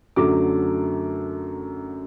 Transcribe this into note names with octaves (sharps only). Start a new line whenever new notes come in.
F#2 D3 F#3 A3 D6